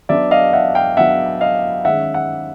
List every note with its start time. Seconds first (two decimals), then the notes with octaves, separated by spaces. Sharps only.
0.09 F#3 B3 D4 D5 E5
0.31 D#5 F5
0.53 E5 F#5
0.75 F5 G5
0.97 F#3 B3 D4 E5 F#5
1.41 D#5 F5
1.85 D#3 G#3 C#4 E5 F#5
2.14 E5 F#5